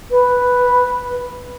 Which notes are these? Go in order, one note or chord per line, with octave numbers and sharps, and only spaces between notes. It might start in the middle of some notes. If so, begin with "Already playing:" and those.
B4